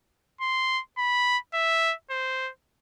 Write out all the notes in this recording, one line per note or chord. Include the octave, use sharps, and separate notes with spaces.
C6
B5
E5
C5